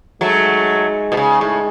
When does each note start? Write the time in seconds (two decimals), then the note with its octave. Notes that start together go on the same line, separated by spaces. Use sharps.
0.21 F#3 G#3 A3 D#4 G#4
1.12 B2
1.17 C#3
1.41 A2